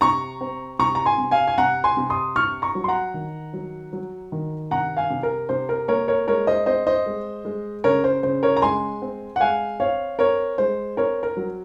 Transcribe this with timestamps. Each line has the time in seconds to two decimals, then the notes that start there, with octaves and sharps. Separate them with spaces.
0.01 C3 A#5 C#6
0.41 C4
0.79 C3 A#5 C#6
0.95 A#5
1.06 G#5 C6
1.18 C3
1.31 F5 G#5
1.47 G#5
1.58 C3 F#5 A#5
1.84 G#5 C6
1.97 C3
2.10 C6 D#6
2.36 C3 C#6 F6
2.62 A#5 C#6
2.75 F#3
2.84 C6
2.88 F#5 A#5
3.14 D#3
3.53 F#3
3.93 F#3
4.32 D#3
4.71 C3 F#5 A#5
4.97 F5 G#5
5.10 C3
5.23 A#4
5.49 C3 C5
5.69 A#4
5.88 A#3 A#4 C#5
6.08 A#4 C#5
6.27 G#3 A#4 C#5
6.47 C5 D#5
6.66 C4 C5 D#5
6.87 C5 D#5
7.06 G#3
7.45 G#3
7.84 C#3 A#4 C#5
8.04 C5
8.23 C#3 C5
8.43 A#4 C#5
8.57 A#5
8.62 G#3 G#5 C6
9.02 C4
9.36 F#5
9.41 G#3 F5 G#5
9.80 C4 C#5 F5
10.19 C4 A#4 C#5
10.58 G#3 C5
10.97 C4 A#4 C#5
11.23 A#4
11.37 F#3